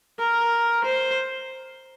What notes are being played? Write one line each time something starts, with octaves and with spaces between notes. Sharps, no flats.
A#4
C5